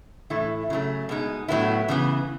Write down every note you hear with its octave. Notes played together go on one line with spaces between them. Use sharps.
A2 E3 A3 E4
C#3 F#3 A3
B2 G#3 D#4
A2 F#3 B3 E4
C#3 E3 B3